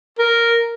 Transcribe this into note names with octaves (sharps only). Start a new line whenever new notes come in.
A#4